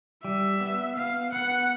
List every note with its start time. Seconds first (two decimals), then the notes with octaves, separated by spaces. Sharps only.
0.24 G3 E5
0.61 B3
0.97 B3 F5
1.33 B3 F#5